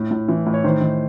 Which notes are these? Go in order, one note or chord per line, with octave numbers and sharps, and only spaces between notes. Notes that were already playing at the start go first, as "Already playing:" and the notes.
Already playing: A2
A2
E3
A2
C#5
D#3 C5
D#3